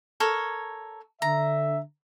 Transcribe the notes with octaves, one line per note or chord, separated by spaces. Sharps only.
A4 A#4 C#5
D3 E5 A#5